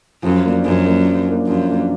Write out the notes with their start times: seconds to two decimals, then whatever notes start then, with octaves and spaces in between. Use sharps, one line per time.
0.23 F#2 F3
0.44 A#3 D4
0.64 F#2 F3
0.84 A#3 D4
1.05 F3
1.26 A#3 D4
1.47 F#2 F3
1.67 A#3 D4